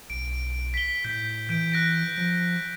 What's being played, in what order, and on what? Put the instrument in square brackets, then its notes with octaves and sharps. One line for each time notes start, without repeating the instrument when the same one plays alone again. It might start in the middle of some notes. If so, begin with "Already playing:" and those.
[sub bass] B1 [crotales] D7
[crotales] B6 G7
[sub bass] A2 [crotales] G6 B6
[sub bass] E3 [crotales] G6 D7
[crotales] F#6 A#6 D7
[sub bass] F3